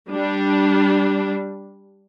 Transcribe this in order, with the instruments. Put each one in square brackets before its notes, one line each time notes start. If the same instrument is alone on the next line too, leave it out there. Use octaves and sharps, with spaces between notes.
[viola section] G3 D4